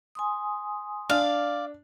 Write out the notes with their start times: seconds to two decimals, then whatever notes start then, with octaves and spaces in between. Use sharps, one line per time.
0.15 G#5 C6 D#6
1.09 D4 D5 F5